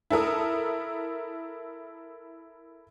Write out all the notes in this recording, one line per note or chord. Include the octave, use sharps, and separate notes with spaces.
E4 A4 A#4 D#6